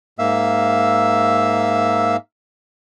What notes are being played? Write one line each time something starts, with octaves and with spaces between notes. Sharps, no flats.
G#2 A#3 E5 F5 E6